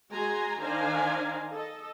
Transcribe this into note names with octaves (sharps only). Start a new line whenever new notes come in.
G#3 F#4 G#5 A#5 C6
D#3 D4 C5 F5 G#5 A#5
A4 D#5